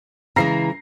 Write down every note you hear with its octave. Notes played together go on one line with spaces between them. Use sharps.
C#3 E3 G#3 A#5 A#6 C7